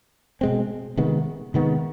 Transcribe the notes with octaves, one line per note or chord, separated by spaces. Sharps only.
B2 G#3 C4
C3 D#3 G#3 B3
C3 D#3 G#3 B3